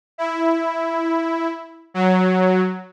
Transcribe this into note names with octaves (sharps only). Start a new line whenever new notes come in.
E4
F#3